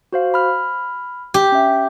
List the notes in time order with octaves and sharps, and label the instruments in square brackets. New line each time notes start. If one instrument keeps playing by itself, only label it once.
[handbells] F#4 C5 F5
B5 F6
[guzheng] G4
[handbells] C#4 E5